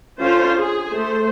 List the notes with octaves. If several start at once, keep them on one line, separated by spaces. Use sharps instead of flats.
D3 C#4 F4 C5
G#4
A3 C5